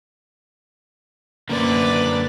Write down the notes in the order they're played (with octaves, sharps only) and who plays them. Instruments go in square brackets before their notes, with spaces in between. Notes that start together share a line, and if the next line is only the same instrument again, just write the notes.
[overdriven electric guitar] F#2 D3 [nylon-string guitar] A#3 C#4 C5 [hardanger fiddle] B4 D5